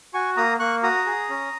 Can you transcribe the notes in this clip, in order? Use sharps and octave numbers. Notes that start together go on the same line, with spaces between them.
F#4 G#5 C#6
A#3 A#5 D#6
A#3 C#6 F#6
F#4 A#5 D#6
G#4
C#4